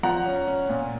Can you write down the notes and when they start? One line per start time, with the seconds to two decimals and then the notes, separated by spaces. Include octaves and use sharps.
0.03 F3 F#5 A#5
0.26 C#4
0.47 C#4
0.69 A#2